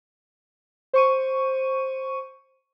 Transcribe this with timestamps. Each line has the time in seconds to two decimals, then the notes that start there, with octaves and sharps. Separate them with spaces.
0.93 C5 C#6 D#7